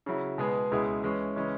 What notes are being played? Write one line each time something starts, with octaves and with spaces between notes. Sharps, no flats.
C#3 F#3 E4
B2 G#3 B3 G#4
C#2 B2 G#3 E4 G#4
E3 G#3 C#4
C#3 E3 G#3 C#4